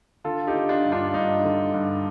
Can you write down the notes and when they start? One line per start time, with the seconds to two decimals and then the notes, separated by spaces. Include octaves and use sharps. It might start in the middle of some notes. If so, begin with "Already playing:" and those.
0.24 D3 F4 A4
0.47 D#4 G4
0.54 D3
0.69 D4 F4
0.85 G2
0.92 D4 F4
1.14 G2 D#4
1.44 D3
1.74 G2